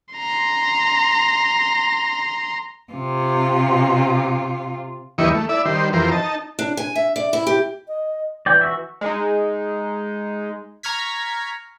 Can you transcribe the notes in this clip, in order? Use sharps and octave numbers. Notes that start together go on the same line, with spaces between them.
A#5 C6
C3 F4
D#2 E3 G3 E4 D#5 C#6
A3
E4 D5 E5
D#3 G3 C5
F2 E3 G4 A#4 C5
D#4 A5
D4
G#5
E5
D5
E4
G4
D#5
E3 D5 G5
F#4 E5
G#3 D#4
A#5 C#6 F6 G#6 B6